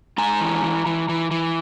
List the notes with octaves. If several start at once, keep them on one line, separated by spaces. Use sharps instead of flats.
G#3 G#5 A#5
E3
E3
E3
E3
E3